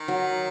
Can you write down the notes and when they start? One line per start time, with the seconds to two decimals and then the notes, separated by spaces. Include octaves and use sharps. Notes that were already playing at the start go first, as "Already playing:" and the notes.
Already playing: D#3
0.08 F#3